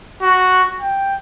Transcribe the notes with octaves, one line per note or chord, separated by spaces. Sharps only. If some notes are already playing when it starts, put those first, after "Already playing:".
F#4
G5